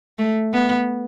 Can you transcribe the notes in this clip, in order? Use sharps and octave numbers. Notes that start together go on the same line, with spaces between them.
A3
B3